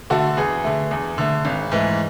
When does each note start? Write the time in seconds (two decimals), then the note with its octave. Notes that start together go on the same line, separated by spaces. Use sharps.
0.10 D3 A3 F#4 A4
0.37 E2 G#4 B4
0.64 D3 A3
0.91 E2
1.18 D3 A3
1.45 G#1
1.72 G#2 E3 A3